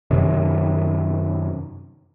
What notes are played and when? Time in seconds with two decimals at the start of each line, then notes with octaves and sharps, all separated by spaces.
0.11 F#2 C3 D#3